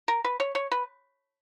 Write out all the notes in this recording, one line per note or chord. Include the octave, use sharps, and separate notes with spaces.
A#4
B4
C#5
C#5
B4